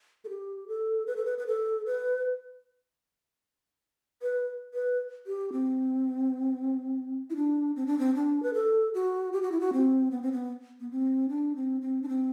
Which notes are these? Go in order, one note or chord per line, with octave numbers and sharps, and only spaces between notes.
A4
G4
A4
B4
A4
B4
B4
A4
B4
B4
B4
G4
C4
E4
D4
C4
D4
C4
D4
B4
A4
F#4
G4
F#4
E4
F#4
C4
B3
C4
B3
B3
C4
D4
C4
C4
D4
C4